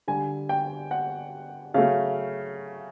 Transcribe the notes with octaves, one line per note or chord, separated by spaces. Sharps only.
D3 G3 G#5
G5
F#5
C#3 F#3 A3 F5